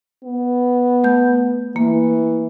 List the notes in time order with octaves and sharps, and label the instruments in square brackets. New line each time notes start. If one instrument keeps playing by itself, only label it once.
[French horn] B3
[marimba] A3 G6
[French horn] E3 [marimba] A#3